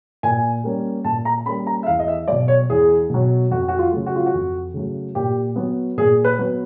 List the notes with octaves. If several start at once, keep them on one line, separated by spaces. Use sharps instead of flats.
A#2 G#5
G3 A#3 C#4
A#2 A5
A#5
G3 A#3 C#4 B5
A#5
E5
E2 F5
D#5
E5
B2 F#3 D5
C#5
E2 G#4
B2 F#3
F2 F#4
F#4
F4
C#3 F#3 A3
F#4
F4
F#4
F2
C#3 F#3 A3
A#2 G4
F#3 B3
A#2 G#4
B4
F#3 B3